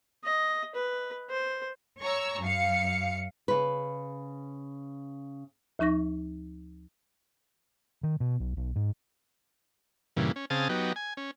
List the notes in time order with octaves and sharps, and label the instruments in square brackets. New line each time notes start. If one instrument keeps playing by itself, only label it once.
[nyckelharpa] D#5
B4
C5
[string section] C#5 A#5 C#6 E6
F#2 F5 C#7
[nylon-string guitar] C#3 B4
[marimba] D2 F3 D#4 C#6 A#6
[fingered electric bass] D#3
B2
B1
B1
G#2
[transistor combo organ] G2 A#2 C#3 E3
C#4
C#3 C4 G#4 F5 A5 D#6
F#3 B3 D#4 G4
G#5
C#4